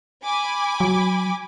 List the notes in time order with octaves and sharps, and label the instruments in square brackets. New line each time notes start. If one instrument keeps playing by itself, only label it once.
[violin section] G#5 B5 D6
[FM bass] F#3